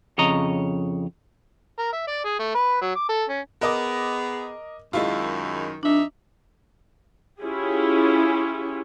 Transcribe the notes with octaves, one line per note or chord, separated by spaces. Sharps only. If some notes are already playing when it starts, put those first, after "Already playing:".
F2 C#3 C#5 D#5 A#5
A#4
E5
D5
G#4
A3
B4
F#3
D6
A4
C#4
B3 G#4 A#4 D#5 D6
F#2 D#3 G#3 E4 F4
F2 D4 D#4 E5
C#4 E4 F4 G4 G#4